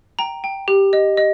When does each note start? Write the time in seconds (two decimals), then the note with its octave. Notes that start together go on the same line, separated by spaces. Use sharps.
0.19 G5 A#5
0.44 G5
0.68 G4
0.93 D#5
1.17 D#5